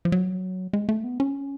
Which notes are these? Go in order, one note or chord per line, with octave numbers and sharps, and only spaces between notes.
F3
F#3
G#3
A3
B3
C#4